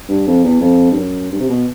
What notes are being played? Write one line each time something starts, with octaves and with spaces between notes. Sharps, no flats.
G2
F2
E2
F2
G2
F#2
G2
C3
B2